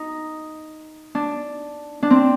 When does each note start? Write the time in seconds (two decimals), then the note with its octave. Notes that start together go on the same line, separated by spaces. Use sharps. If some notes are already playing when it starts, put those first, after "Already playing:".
Already playing: D#4
1.15 D4
2.03 D4
2.10 C4